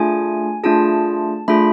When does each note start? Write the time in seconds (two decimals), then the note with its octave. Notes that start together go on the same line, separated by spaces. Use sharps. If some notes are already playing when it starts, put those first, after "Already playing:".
Already playing: A3 D4 F4 G#4 G#5
0.64 A3 D4 F4 G#4 A5
1.48 A3 D4 F4 G#4 B5